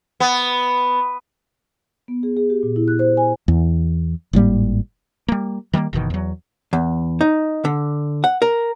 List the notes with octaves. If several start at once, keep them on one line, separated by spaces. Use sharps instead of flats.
B3
B3
G#4
G#4
G4
A#2
E4
F#6
C5
G#5
E2
G#1 A2 G3 A#3
G3 A#3
D#3 G3 G#3 A#3
F#1 B2 D#3 E3
E2 F#3
E2
D#4
D3
F#5
A#4